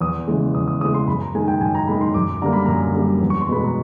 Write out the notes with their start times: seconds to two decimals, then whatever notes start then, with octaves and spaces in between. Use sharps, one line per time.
0.01 E2 D#6
0.28 C#3 E3 G#3
0.54 E2 D#6
0.68 D#6
0.81 C#3 E3 G#3 D#6
0.94 C6
1.08 F#2 B5
1.21 A#5
1.35 D#3 G#3 G#5
1.48 G5
1.61 F#2 G#5
1.75 A#5
1.88 D#3 G#3 B5
2.01 C6
2.14 F#2 D6
2.42 D3 G3 A#3 A#5
2.53 B5
2.66 F#2 A#5
2.95 D3 G3 A#3
3.21 E2
3.30 C#6
3.41 C6
3.49 B2 G#3 B3 B5
3.64 A#5